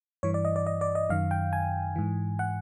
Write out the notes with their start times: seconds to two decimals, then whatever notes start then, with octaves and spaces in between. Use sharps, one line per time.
0.23 G2 E3 C#5
0.34 D5
0.45 D#5
0.56 D5
0.67 D#5
0.81 D5
0.95 D#5
1.10 F#2 D#3 F5
1.31 G5
1.53 G#5
1.96 G#2 E3
2.39 F#5